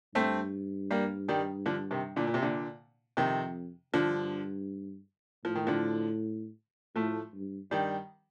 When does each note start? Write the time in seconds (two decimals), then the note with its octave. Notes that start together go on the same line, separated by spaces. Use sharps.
0.15 G2 A3 C4
0.91 G3 A#3
1.28 D#3 G3
1.66 D3 F3
1.91 C3 D#3
2.16 A#2 D3
2.27 A#2
2.34 C3
2.42 A#2 D3
3.17 F2 C3 D#3
3.94 G2 D3 F3
5.45 A2 F3
5.55 D#3
5.67 D3 F3
6.96 A2 F3 A3
7.34 G2
7.71 G2 D#3 G3